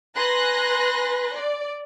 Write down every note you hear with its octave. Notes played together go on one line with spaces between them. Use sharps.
B4 G#5 A#5 C6 F#6 A#6
D5